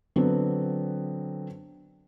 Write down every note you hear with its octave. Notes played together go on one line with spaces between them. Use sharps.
D3 F#3 B3 C4